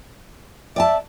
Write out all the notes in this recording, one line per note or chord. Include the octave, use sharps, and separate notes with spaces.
D5 E5 G#5 A5